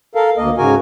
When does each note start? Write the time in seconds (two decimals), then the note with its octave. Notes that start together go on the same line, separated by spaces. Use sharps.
0.15 A4 A#4 F5
0.37 D2 A#3 D#5
0.58 G#2 C#3 F#4 A#4 G#5